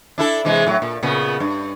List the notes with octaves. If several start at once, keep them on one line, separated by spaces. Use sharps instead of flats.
D4 E4 A4
C3 E3 G#3
A2 F#3
A#2
A#2 C#3 B3
G2